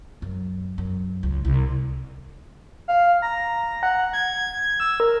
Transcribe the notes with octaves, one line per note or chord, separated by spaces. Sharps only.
F#2
F#2
C#2
C2
F5
A#5
F#5
G#6
E6
A#4